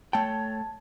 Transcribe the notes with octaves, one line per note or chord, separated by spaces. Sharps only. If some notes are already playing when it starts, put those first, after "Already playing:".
A3 C#5 G5 A5